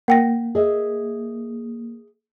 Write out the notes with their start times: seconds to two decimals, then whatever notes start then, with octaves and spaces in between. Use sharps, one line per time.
0.08 A#3 F#5 G5 A#6
0.55 G#4 D#5 E5